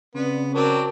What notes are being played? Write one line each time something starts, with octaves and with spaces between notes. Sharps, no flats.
C#3 B3 C4 D5
F#3 C4 F#4 A#4 D5 A5